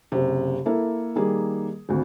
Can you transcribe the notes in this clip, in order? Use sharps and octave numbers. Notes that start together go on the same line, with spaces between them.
F#1 C3
A#3 E4 A4
D#3 G3 A#3 G#4
G#1 D2